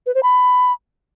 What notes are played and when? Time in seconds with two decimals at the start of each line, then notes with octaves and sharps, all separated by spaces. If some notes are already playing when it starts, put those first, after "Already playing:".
0.06 B4
0.15 C5
0.23 B5